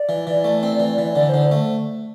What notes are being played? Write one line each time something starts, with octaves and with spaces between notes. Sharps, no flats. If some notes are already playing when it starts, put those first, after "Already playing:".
Already playing: D5
E3
E3
A3
C4
E3
E3
D3 D5
D3 C5
A3